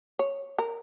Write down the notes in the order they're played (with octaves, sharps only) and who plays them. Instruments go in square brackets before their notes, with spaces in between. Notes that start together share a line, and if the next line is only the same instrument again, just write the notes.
[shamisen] C#5
A#4